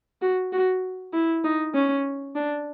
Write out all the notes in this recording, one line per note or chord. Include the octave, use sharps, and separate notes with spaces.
F#4
F#4
E4
D#4
C#4
D4